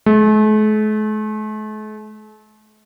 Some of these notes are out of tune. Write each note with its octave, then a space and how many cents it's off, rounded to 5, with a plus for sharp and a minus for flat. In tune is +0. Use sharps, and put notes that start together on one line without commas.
A3 -45